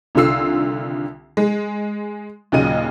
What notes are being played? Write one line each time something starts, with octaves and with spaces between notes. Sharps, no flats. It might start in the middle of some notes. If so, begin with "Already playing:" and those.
C2 D3 D#3 F4 E6 C7
G#3
D#2 A#2 C#3 F#3 D#5 D#7